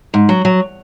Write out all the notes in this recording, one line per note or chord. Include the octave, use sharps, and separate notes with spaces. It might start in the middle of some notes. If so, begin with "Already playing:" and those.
G#2
F#3
F#3